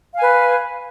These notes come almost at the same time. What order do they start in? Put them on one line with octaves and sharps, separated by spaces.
F5 G#5 B4